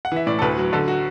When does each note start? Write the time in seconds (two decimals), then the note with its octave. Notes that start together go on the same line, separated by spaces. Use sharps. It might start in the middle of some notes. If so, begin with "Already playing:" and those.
0.05 F#5
0.12 E3 E5
0.27 A2 D5
0.39 A4
0.42 D2 B4
0.58 F#3
0.73 D3 A4
0.88 F#3 F#4